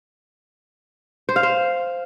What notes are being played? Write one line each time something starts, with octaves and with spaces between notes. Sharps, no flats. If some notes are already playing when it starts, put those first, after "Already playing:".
C5
F5
C5